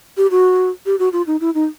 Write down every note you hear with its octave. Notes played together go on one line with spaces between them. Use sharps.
G4
F#4
G4
F#4
F4
D#4
E4
D#4